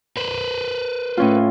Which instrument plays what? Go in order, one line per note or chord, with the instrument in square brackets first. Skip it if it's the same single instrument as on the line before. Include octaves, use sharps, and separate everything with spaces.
[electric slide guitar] B4 C5
[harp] A2 C#4 F4